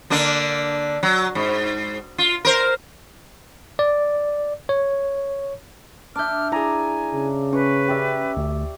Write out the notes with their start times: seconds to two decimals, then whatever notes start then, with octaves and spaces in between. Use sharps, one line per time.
0.10 D3 A#3 D4
1.03 F#3
1.35 G#2
2.18 F4
2.45 A#4 C5
3.79 D5
4.69 C#5
6.16 D4 E5 D6 F6 G6
6.52 E4 G#4 D5 G#5 A#5
7.14 C#3
7.53 C#4 B4 C#6
7.88 G4 D5 E5
8.37 D2